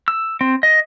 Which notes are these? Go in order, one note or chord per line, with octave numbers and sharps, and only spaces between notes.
E6
C4
D#5